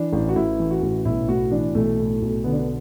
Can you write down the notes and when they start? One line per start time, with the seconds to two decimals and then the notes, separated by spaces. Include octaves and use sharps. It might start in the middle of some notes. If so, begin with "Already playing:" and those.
Already playing: E3 D4
0.13 A1
0.29 F#4
0.36 A1 E4
0.59 E3
0.71 F#4
0.82 A1
1.05 B1 E4
1.29 A2 F#4
1.51 E3 D4
1.75 B1 A3
1.98 A2
2.22 B1
2.44 D3 B3
2.52 D4
2.59 B3